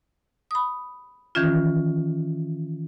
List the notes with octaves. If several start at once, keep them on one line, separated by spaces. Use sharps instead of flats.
B5 D#6
D#3 E3 C#4 F4